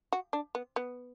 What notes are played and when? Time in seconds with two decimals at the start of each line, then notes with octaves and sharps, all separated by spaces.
0.12 F#4
0.33 D4
0.55 B3
0.76 B3